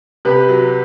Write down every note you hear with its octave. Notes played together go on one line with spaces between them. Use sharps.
C3 G4 B4
F#3